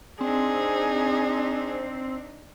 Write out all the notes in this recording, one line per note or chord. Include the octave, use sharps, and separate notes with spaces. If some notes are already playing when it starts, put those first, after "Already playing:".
C4 D4 D#4 G#4